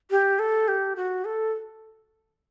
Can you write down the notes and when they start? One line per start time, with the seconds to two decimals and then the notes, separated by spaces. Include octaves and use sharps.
0.11 G4
0.39 A4
0.68 G4
0.96 F#4
1.25 A4